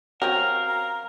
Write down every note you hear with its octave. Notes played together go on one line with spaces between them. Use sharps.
F#3 C4 C#4 A#4 F5
A#5